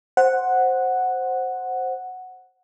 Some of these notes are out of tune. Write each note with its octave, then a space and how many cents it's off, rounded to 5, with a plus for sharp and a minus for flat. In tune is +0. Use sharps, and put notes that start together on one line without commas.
C5 +5 F#5 +0